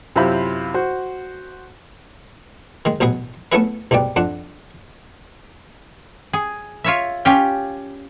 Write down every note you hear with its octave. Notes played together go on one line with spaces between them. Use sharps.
F#2 C3 E4 F4 C5 B5
F#4 C5
D#3 G#3
A1 B2 F#3 B3 G#4
A3 B3 C#4 E4 G#4 B4
C2 G#2 B2 D5 G5
F2 D4 F#5
G#4
F4 C#5 E5
C#4 F4 G4 G5